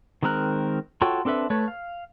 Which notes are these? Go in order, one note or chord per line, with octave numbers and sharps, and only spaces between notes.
D#3 G#3 C4 A#4 F#6
F4 F#4 A4 C#5 G5
C4 D4 A4 B4 E5
A3 B4 C#5
F5